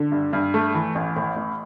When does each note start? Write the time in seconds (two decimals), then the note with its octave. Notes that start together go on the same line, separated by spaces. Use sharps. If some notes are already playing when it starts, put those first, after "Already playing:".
Already playing: D3
0.12 G2
0.33 G2
0.54 A3
0.74 E3
0.95 A1
1.16 A2
1.36 A1